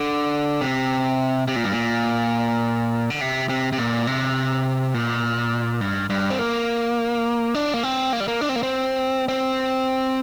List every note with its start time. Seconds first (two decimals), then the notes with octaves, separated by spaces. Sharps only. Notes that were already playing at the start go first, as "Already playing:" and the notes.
Already playing: D3
0.61 C3
1.48 C3
1.56 A#2
1.64 G2
1.72 A#2
3.10 D3
3.21 C3
3.49 C3
3.73 C3
3.79 A#2
4.07 C3
4.94 A#2
5.81 G2
6.10 G2
6.30 C4
6.39 A#3
7.55 D4
7.74 A#3
7.83 C4
8.13 A#3
8.20 G3
8.28 A#3
8.41 D4
8.49 C4
8.56 A#3
8.63 C4
9.28 C4